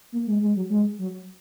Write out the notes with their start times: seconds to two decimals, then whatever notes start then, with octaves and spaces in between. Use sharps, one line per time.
0.12 A#3
0.27 G#3
0.41 G#3
0.56 F#3
0.70 G#3
0.99 F#3